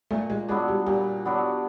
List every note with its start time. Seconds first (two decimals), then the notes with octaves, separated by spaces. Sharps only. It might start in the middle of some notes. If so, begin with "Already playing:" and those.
0.11 A#2 A3
0.30 G#3
0.48 F#3 G#3 B3 D4
0.68 G3
0.86 A#2 G3
1.25 F#3 B3 D4